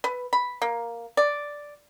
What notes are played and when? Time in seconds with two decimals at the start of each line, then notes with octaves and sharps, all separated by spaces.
0.04 B4
0.33 B5
0.62 A#3
1.17 D5